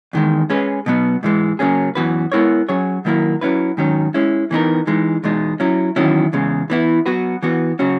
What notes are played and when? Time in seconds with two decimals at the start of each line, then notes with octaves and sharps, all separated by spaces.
0.13 E2 D#3 G#3
0.50 G#3 C#4 G#4 B4
0.86 B2 F#3 B3
1.23 G#2 E3 G#3
1.59 C#3 F#3 A#3 C#4 G#4
1.95 F#2 E3 B3 F#4 B4
2.32 G#3 B3 E4 A#4 C#5
2.68 F#3 C#4 G#4 C#5
3.05 D#3 F#3 A#3 E4 A#4
3.41 F#3 C#4 E4 B4
3.77 G#2 D#3 F#3 C#4
4.14 G#3 C#4 E4
4.51 E3 B3 D#4 A#4
4.87 E3 G#3 D#4
5.24 E2 B2 G#3 D#4
5.60 F#3 C#4 E4
5.96 E2 D#3 F#3 C#4 E4
6.33 E2 C#3 G#3
6.70 E3 B3 E4
7.06 F#3 B3 F#4 B4
7.42 E3 B3 F#4
7.79 C#3 F#3 C#4 F#4